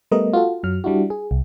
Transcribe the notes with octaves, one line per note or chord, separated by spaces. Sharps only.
G3 A3 B3 A#4 D#5
F4 F#4 A4
F#2 F#3 F6
G3 D4 E4 F#4
G#4
C2